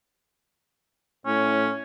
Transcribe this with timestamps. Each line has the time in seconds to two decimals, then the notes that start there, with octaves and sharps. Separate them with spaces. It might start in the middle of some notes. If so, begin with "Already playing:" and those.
1.26 A2 C#4